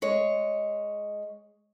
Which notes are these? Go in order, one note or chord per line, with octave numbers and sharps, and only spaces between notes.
G#3 C#5